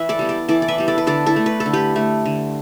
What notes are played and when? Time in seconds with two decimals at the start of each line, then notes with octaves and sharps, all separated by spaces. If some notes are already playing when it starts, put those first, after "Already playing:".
Already playing: E3 B4 E5
0.09 A4 D5
0.19 G3 B3
0.29 A4 D5
0.48 E3 A4 D5
0.62 D5
0.68 B4 E5
0.78 G3 B3
0.88 A4 D5
0.98 B4
1.07 D3 A4 D5
1.26 E4 A4
1.36 A3
1.46 B4
1.60 A4
1.66 D3
1.73 G4 B4
1.96 A3
2.26 D3